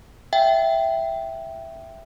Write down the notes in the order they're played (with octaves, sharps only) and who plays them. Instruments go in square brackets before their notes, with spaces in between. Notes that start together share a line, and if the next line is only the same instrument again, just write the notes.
[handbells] E5 G5